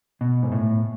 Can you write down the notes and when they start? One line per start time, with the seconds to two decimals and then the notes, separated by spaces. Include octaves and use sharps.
0.21 B2
0.43 G#2
0.52 A2